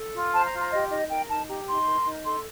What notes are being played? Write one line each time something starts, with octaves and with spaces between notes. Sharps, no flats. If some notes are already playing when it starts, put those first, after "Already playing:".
Already playing: A4
F4
C5 A5
A#5
F4
A#5
G4 D#5
D#4 D#5
A#4 G5
D#4 A5
G4 A#5
D#4 C6
A#4
D#4
A4 C6